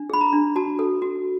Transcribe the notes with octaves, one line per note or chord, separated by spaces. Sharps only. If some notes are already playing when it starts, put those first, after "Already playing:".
Already playing: D4
G#4 B5
A#5
D4
F#4 A5
A4
F#4